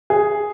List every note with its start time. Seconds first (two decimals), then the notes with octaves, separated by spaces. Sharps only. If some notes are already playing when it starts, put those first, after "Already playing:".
0.10 G#4